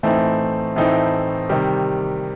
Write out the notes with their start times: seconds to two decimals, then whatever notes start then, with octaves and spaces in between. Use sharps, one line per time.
0.03 A2 E3 A3 C4 D#4
0.76 A2 E3 A3 C4 D#4
1.49 C3 D#3 G3